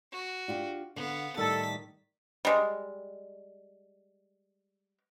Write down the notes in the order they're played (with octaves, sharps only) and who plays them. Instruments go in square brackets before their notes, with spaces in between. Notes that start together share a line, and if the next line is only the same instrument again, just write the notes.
[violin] F#4
[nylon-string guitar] D4 F4 G4
[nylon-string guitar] D3 [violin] B3 F5
[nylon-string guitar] A2 D#3 G3 [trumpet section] A4 [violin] A6 B6
[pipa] G3 G#3